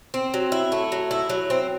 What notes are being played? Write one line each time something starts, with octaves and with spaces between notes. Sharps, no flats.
C4
F#3
E4
A3
F#3
E4
F#3
C4